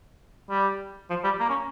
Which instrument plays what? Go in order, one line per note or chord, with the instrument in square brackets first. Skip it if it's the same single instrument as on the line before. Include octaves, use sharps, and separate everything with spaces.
[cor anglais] G3
F3
G3
A#3
C#4